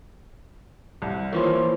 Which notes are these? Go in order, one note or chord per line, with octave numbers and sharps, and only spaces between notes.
C2
E3 F3 A#3 C#5 C6